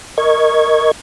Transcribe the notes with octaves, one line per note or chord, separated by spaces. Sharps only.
A#4 D#5 C#6 G#6